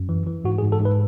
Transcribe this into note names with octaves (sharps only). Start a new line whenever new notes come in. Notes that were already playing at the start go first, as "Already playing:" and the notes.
Already playing: F#2
E3
E3
G#2 F#4
G#4
G#2
A4
G#2
B4